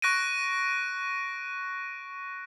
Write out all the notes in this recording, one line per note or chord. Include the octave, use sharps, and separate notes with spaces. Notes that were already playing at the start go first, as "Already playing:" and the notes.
C#6 F#6 A#6 D7 D#7